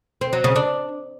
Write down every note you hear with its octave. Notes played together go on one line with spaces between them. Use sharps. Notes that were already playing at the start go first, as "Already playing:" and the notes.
C4
F#3
C#3
D4